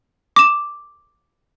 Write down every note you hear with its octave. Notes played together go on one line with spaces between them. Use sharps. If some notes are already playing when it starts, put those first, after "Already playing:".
D6 E7